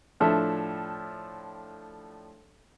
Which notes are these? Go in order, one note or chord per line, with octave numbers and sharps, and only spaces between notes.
A2 F3 D4 A4 E5